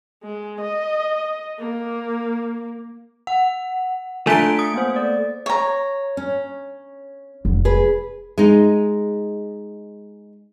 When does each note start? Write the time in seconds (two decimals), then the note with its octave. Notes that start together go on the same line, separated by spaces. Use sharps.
0.23 G#3
0.61 D#5
1.59 A#3
3.27 F#5
4.27 A3 D4 F4 G#5 A#5 B6 D7
4.59 D#6
4.74 A#3 B3 C5
4.96 D5
5.46 C#5 A#5
6.17 C#4
7.45 F1
7.65 G#4 B4
8.38 G#3 D#4